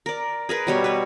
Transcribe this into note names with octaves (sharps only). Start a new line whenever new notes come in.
A#4 D5
G#4 A#4 B4
B2 G3 C#5
B4 C#5